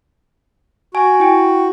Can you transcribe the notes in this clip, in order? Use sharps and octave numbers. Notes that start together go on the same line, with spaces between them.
F#4 G#5
E4 G5